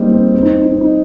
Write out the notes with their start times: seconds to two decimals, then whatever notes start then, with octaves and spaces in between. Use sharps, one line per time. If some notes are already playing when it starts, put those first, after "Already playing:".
Already playing: G3 A#3 C4 D#4
0.12 C4
0.34 C4
0.43 D#4
0.52 C4
0.62 D#4
0.71 C4
0.81 D#4